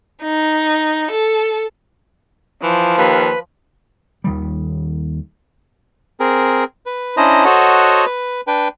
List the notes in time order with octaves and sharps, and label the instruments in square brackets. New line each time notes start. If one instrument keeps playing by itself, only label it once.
[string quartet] D#4
A4
[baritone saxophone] E3 [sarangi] F3
[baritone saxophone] D#2 [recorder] B4
[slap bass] D#2 D#3 G3
[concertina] C4 G#4 A#4
B4
C#4 D4 E4 C5 D#5 A#5
F#4 A4 C5 C#5 D#5 F#5
B4
D4 B4 G5